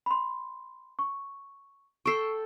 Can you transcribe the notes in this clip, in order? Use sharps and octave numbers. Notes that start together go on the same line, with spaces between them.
B5 C6
C#6
A4 G5 C#6 C7